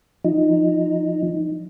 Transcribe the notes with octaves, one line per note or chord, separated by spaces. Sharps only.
F3 D#4